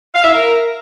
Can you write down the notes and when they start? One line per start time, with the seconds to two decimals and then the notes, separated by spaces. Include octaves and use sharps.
0.14 F5
0.24 E5
0.34 A#4